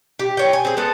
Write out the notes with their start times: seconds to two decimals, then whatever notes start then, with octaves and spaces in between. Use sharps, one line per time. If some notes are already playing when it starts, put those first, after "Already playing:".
0.19 G4
0.37 C#5 G5
0.53 G#5
0.65 C4 G#4
0.77 G#3 B3 A4